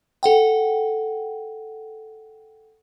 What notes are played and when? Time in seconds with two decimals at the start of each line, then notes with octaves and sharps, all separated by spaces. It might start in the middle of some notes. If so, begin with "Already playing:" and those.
0.23 A4 F#5 G5